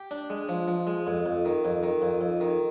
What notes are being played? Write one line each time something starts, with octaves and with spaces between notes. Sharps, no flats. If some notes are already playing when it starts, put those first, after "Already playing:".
Already playing: G4
D4
G#3
F3
F3
G#3
F2
F2
D#3
F2
D#3
F2
F2
D#3